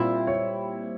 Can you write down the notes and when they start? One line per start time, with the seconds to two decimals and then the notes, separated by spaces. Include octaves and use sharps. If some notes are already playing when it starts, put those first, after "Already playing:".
Already playing: A#2 G3 C4 E4 F4
0.27 C#5